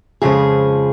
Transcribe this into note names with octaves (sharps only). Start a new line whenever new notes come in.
F2 C#3 F3 G#3 G#4